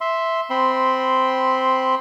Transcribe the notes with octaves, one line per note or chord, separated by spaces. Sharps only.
E5 C6
C4 B5 C6